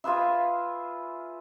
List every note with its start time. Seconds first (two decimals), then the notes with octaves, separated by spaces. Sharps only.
0.04 F4 G#4 B4 E5